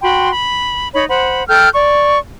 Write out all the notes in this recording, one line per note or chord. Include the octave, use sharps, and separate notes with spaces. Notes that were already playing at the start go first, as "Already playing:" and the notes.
F#4 G5 B5 C6
B5
D#4 C#5 B5
C5 F#5 B5
A4 G5 F6 G6
D5 C#6